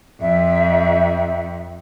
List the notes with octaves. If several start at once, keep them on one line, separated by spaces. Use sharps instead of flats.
F2 E5